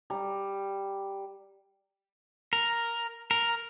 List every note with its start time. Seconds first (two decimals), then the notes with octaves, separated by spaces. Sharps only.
0.10 G3 A#5
2.53 A#4
3.31 A#4